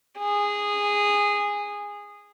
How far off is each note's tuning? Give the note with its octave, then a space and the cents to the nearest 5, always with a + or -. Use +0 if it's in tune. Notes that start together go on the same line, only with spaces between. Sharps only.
G#4 -15